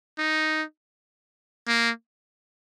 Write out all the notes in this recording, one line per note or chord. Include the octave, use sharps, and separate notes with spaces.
D#4
A#3